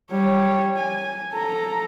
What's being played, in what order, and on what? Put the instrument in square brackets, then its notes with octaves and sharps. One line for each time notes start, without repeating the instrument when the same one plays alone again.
[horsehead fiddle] G3 C#5
G#5
A4 A#5